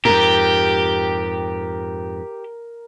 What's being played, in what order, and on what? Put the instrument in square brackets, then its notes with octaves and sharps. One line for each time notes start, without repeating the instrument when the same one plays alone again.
[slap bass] F2 G#2 [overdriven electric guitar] G4 [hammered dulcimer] A#4